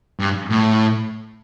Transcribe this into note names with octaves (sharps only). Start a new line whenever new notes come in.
G2
A2